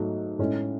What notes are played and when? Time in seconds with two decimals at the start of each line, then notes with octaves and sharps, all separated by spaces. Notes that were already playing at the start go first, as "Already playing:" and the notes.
Already playing: G#2 F#3 A3
0.39 A2 G#3 C#4